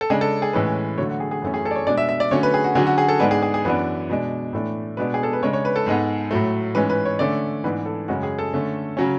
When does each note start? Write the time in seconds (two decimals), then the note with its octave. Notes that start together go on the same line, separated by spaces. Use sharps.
0.01 A4
0.10 C#3 G#3 D4 G#4
0.21 A4
0.42 G#4
0.53 A2 E3 G#3 C#4 B4
0.98 D3 F#3 A3 C#5
1.09 F#4
1.20 G#4
1.31 G#4
1.42 F#2 E3 A3 C#4
1.54 G#4
1.65 A4
1.71 D5
1.76 C#5
1.87 B2 G#3 D4 D5
1.98 E5
2.09 E5
2.20 D5
2.31 D3 F#3 A3 C#4 C#5
2.43 B4
2.54 G#4
2.64 F#4
2.75 D3 F#3 C#4 G#4
2.87 F#4
2.98 G#4
3.09 A4
3.20 G#2 G#3 B3 D4 B4
3.31 G#4
3.42 G#4
3.54 G#4
3.65 F#2 E3 B3 D4 B4
4.10 B2 G#3 D4
4.53 A2 E3 A3 D4
4.97 B2 G#3 B3 D4 B4
5.14 G#4
5.23 A4
5.33 B4
5.43 C#3 G#3 D4 C#5
5.53 C#5
5.65 B4
5.76 A4
5.87 G#2 G#3 B3
6.31 A2 F#3 A3
6.75 G#2 E3 G#3 C#4 B4
6.90 B4
7.05 C#5
7.19 D3 A3 C#4 D5
7.64 G#2 E3 B3 D4 B4
7.86 A4
8.08 F#2 C#3 G#3 C#4 F#4
8.23 G#4
8.39 A4
8.53 D3 A3 C#4
8.97 C#3 F#3 C#4